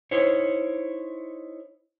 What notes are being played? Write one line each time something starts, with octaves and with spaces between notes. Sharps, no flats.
D#4 E4 C5 C#5